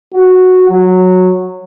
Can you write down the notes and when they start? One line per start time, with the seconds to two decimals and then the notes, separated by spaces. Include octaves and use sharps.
0.13 F#4
0.69 F#3